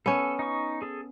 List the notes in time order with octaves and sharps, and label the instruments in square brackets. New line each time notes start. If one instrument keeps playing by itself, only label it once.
[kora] B3 C#4 [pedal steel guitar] A4
[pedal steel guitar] D#4 C#6
G#4 A4